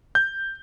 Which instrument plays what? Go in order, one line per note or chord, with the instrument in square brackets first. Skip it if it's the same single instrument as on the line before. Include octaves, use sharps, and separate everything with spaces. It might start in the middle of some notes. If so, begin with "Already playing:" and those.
[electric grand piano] G6